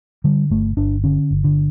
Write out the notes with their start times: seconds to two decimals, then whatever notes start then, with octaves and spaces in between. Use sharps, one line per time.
0.24 D3 G3
0.50 G1 A3
0.77 G1 D4
1.04 D3 C#4
1.30 G1
1.44 D3